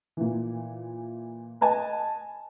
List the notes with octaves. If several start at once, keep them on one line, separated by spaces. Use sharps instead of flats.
A#2 E3
B4 D#5 G#5 A5